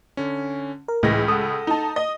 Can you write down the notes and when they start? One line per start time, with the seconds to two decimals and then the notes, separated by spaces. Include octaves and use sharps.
0.17 D3 C#4
0.88 A#4
1.03 C#2 A2 E3 D#5 A#6
1.28 A4 F#5 D#6
1.67 D#4 A5
1.96 D#5